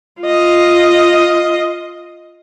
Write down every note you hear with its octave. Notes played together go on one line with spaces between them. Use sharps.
F4 D#5